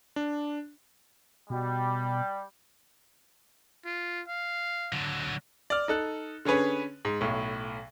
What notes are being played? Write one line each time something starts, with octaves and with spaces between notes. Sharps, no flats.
D4
B2 G3
F4
F5
D3 F#3
D5 F6
D#4 A4 F#6
D3 C#4 G#4 B4 C#5
G#2
B1 A2